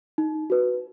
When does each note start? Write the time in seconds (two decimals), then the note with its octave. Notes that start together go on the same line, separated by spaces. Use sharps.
0.18 D#4
0.50 F#4 B4